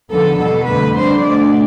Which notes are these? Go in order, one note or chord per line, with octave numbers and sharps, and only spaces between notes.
E2 D3 F3 B3 A4
B2 G3 B3 A4
F2 D3 A3 B4
D3 G3 D4 C5
B2 A3 D4 D5